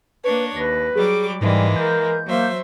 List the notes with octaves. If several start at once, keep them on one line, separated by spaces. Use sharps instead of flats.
A#3 D4 B4 C#5
D#2 B4 A#6
F#3 G3 G#4 D6
G#2 E3 G3 G#3 A#3
A#4 G6
F#3 A#3 C5 E5